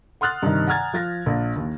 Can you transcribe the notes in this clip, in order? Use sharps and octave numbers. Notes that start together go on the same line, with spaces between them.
F#5 C6 D#6 F6 F#6 A6
G2 C3 D#3
F#5 G#5 A#5 F6 G#6 A6
F3 A6 A#6
A#1
D#2